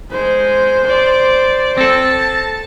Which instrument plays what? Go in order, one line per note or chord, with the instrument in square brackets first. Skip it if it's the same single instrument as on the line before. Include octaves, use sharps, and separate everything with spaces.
[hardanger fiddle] G#3 [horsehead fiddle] C5
[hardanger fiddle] D5
[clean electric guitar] C4 A4 [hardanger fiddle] A5